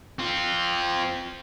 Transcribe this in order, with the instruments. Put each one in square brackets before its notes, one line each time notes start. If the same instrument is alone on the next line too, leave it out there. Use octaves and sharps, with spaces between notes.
[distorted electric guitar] C4 F4